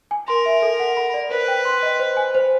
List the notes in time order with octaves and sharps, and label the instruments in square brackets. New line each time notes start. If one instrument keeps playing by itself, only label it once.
[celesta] G#5
[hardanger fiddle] A#4 [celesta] C6
[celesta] E5
A4
F#5
B5
D5
[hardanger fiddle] B4 [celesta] C5
[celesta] G5
C6
D#5
C5
G#5
C5